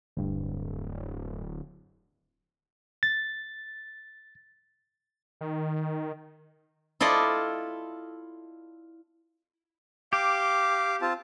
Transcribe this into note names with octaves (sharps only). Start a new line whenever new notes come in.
D1 D2 G2
A6
D#3
E4 F4 A4 D5 D#5
G4 F5 D6
C4 F4 A5